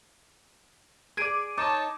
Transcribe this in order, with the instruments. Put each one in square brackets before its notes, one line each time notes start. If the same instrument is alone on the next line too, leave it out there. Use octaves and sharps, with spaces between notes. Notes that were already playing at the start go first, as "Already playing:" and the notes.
[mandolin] G#4 B4 D5 [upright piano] G#6 D7 D#7
[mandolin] D#4 [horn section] C#5 A5 [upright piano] D6 D#6